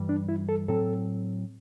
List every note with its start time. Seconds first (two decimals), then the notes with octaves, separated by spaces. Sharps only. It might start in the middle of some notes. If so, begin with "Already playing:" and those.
Already playing: G2 E3 G3
0.09 D4
0.29 E4
0.49 A4
0.68 A2 F#3 C4 A4